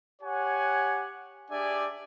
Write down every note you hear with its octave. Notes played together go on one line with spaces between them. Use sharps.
G4 C#5 F#5 G#5
D4 G4 G#4 D5 E5 G#5